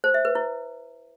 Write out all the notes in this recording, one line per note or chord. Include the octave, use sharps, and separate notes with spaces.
C5
E5
B4
E4